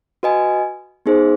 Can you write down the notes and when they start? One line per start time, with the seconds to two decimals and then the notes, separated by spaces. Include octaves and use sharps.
0.23 F#4 B4 D#5 G#5
1.06 B3 D#4 G#4 C5